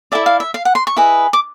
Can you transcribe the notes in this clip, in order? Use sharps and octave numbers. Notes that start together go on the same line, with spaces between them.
E4 A4 D5 E5
F5
E5
F5
F#5
C6
C#6
E4 G#4 B4 D#5
D6